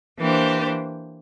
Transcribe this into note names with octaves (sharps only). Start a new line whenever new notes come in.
E3 A#3 D4 G4 C5